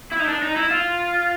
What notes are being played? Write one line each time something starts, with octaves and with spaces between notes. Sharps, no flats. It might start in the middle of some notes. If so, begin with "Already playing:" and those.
E4
D#4
D4
D#4
E4
F4